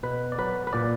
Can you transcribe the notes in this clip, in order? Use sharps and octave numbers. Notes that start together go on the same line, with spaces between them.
B2 B4
D5
F#3 B4
B4
A#2 D5